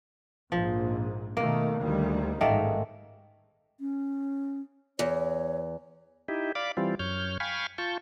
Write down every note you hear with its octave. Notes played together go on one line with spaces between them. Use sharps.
A#1 G#2 F3
B2 D#3 A3 A#3
D2 D#3 G3
A1 G#2 D#3 A3 A#3
C#4
E2 C#5
D#4 E4 G4
D5 F5 B5 D6
E3 G3 C4 F4
F#2 C#5 F6 G6
F5 G5 G#5 B5 C#6 F6
F4 A5 C#6 G6